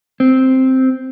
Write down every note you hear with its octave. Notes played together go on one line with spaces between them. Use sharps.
C4